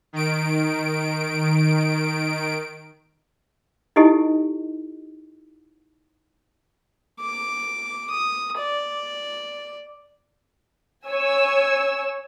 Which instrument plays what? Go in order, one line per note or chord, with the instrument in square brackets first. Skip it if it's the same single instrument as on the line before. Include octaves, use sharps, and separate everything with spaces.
[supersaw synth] D#3 D7
[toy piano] D#4 E4 G4 A4 D#5
[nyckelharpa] D6
D#6
D5
[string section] C#5 G#5 E6